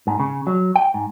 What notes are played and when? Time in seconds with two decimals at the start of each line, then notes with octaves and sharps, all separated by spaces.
0.07 G#2
0.20 C#3
0.47 F#3
0.76 G5
0.94 G#2